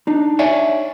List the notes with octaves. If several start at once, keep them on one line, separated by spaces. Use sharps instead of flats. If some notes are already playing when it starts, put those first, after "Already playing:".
D4 D#4
C#5 D5 E5 G#5